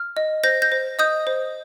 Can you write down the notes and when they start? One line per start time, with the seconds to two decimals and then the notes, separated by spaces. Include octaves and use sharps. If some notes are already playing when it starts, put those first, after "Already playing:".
Already playing: F6
0.17 D#5
0.44 C5 G6 A#6
0.62 G6 A#6
0.72 C5
0.99 D#5 D#6 G6
1.27 C5